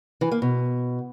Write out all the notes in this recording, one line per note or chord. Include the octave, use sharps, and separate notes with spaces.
E3
A#3
B2